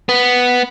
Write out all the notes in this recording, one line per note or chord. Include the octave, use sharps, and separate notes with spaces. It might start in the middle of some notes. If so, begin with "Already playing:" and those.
B3